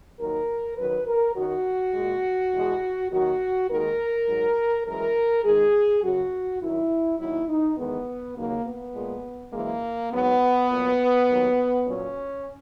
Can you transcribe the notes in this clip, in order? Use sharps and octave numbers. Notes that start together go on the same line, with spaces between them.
D#2 D#3 F#3 A#4
F#2 D#3 F#3 B4
A#4
F#2 D#3 F#3 F#4
A#2 G#3
E2 B2 G#3
D#2 D#3 F#3 F#4
D#2 D#3 G#3 A#4
G#2 F#3
F#2 E3 G#3 A#4
G#2 D#3 G#3 G#4
F#2 C#3 F#3 F#4
F#2 D#3 F#3 E4
D#2 D#3 F#3 E4
D#4
E2 D#3 G#3 B3
D#2 C#3 F#3 A#3
B3
A#2 G#3
F#2 E3 G#3 A#3
G#2 F#3 B3
A#2 F#3
D#2 D#3 F#3
A#2 F#3 C#4